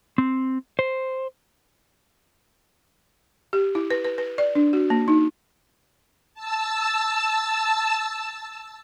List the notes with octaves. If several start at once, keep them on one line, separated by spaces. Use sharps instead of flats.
C4
C5
G4
E4
B4
B4
B4
D5
D4
F#4
A#3
D#4
A5 E6